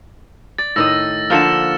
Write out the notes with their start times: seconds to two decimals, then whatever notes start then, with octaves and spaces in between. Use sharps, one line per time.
0.58 D5 A6
0.76 A2 D#3 D#5 E6 A#6
1.30 D3 F3 A#3 F6 C#7 E7